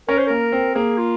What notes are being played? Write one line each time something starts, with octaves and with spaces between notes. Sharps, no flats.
C#4 A#4
C5
A#3 A#4
C4
A#3 G#4
F4